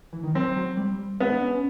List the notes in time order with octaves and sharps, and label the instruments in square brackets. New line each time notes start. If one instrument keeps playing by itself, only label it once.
[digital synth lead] E3
D#3
[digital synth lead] F#3 [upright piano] C4
[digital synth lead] F#3
G3
[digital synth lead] G#3 [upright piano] B3
[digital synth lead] D4
C#4